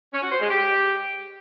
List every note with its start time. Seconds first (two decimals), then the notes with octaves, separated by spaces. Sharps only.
0.13 C#4
0.22 F#4
0.31 C5
0.41 G#3
0.50 G4